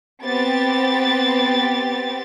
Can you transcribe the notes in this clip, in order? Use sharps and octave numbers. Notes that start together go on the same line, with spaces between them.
B3 C4 G4 A6